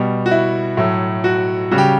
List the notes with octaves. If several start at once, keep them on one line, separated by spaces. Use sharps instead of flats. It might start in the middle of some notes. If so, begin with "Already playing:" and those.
Already playing: B2 G3
F#4
E4
A2 F#3 A3
F#4
C#3 G3 F#4
G4